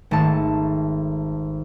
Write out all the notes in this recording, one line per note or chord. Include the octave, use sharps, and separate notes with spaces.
G#1 A3 A5